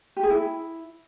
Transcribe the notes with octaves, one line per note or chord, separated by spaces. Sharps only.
G4
G#4
E4